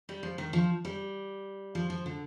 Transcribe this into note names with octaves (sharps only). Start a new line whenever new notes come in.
G3
F3
D#3
F3
G3
F3
F3
D3